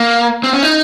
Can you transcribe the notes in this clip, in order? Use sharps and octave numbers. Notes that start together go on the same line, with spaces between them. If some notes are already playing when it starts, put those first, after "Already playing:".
Already playing: A#3
C4
C#4
D#4